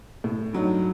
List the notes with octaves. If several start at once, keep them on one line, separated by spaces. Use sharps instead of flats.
A2
G2 F#3 D#4